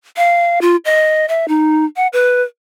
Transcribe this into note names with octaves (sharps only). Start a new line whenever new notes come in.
F5
F4
D#5
E5
D#4
F#5
B4